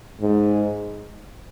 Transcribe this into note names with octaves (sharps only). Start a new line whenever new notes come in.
G#2